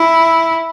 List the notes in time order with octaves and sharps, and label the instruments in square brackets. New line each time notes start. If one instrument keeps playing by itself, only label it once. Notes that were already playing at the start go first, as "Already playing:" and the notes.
Already playing: [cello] E4